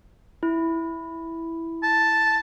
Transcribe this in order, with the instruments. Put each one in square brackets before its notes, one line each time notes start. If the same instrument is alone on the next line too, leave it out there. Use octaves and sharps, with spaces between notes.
[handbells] E4
[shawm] A5